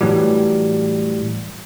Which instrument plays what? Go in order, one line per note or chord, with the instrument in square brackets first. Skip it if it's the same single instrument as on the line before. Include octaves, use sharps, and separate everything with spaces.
[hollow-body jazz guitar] A2 E3 F#3 G3